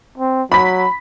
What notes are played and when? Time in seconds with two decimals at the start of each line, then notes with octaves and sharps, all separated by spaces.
0.18 C4
0.52 F#3 B5 B6